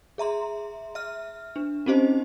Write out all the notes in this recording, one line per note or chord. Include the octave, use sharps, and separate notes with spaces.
G#4 E5 A#5 C6
E5 F6
D4
C4 C#4 D#4 G4 C5 D#5